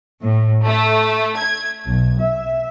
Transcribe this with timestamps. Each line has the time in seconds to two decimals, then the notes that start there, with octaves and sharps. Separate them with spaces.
0.21 A2
0.65 A3
1.38 G#6
1.87 B1
2.20 E5